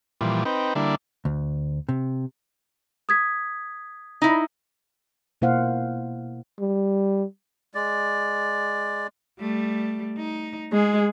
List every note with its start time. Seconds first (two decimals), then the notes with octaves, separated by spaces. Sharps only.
0.21 A#2 E3 F3 G3
0.45 C4 D#4 B4 G5
0.75 D3 G3 A#3 D4 E4
1.25 D2
1.89 C3
3.09 D#6 G#6 B6
4.22 D#4 E4
5.42 B2 A#3 E4 C5 F5 F#5
6.60 G3
7.74 G#3 D5
9.40 G3 A3
10.17 D#4
10.73 G#3 G#4